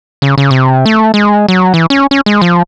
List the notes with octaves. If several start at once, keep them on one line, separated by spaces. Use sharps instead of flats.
C#3
C#3
C3
A3
G#3
F#3
E3
C#4
C#4
G#3
F3